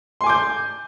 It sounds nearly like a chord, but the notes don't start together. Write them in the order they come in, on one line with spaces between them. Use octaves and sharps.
C6 G#5 D6 G6